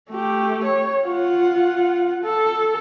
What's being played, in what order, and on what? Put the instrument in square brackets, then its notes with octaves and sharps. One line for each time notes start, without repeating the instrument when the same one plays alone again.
[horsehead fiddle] A3 G4
C#5
F4 F#5
A4